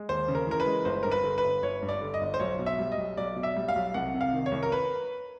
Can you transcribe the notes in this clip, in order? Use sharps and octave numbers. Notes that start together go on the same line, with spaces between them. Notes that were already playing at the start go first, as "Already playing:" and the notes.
Already playing: G#3
D#2 C5
C#3
A#4
E3 A#4
B4
G#3
G1 C5
G2 A#4
B4
D3
B4
G1
G1 C#5
G2
D5
D3
D#5
G1
C5
B1 C#5
B2
E5
G3
D#5
B1
B1 D5
B2
E5
G3
F5
B1
C2 F#5
C3
F5
D#3
C#5
C2
A#4
B4